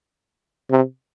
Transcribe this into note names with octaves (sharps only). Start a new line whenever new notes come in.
C3